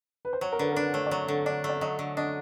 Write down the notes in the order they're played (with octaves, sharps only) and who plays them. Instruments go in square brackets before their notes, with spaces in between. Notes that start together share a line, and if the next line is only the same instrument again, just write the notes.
[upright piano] B4
C5
[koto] F#3 [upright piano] C#5
[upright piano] A#4
[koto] D3 [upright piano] B4
[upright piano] A#4
[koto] D4 [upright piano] B4
[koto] A3 [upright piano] C#5
[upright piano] D5
[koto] F#3 [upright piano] C#5
[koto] D3
[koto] D4 [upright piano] D5
[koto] A3
[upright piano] D5
[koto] F#3 [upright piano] D#5
[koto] D3
[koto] D4 [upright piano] D#5